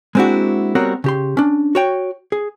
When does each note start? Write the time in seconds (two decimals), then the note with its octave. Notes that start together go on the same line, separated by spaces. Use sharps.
0.15 G#3 A#3 C4 D4 E4 F#4
0.75 G3 B3 C4 F#4 A#4 C#5
1.04 C#3 G4 C6
1.37 C#4 D4
1.75 F#4 C#5 G5
2.32 G#4